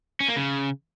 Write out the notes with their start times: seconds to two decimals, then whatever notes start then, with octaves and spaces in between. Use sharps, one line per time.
0.20 C#4
0.28 A#3
0.36 C#3